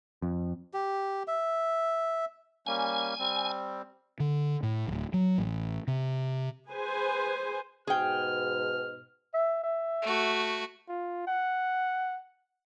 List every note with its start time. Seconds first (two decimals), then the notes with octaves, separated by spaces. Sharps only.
0.22 F2
0.74 G4
1.28 E5
2.67 G3 A#3 C#4 G#5
3.19 G3 C4
4.20 D3
4.63 A2
4.88 D1
5.14 F#3
5.38 A1
5.87 C3
6.70 G#4 B4 C5 G#5
7.87 G#2 B2 G#4 G5 F6
9.34 E5
9.63 E5
10.02 A3 F#4
10.89 F4
11.27 F#5